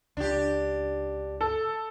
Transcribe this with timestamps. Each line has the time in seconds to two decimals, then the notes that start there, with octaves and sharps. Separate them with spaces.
0.17 C#2 D4 G4
1.41 A4